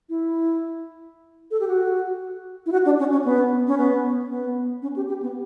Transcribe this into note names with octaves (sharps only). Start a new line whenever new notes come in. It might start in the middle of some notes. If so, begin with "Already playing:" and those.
E4
A4
G4
F#4
E4
F#4
D4
C#4
C#4
B3
C#4
B3
B3
C#4
G4
G4
B3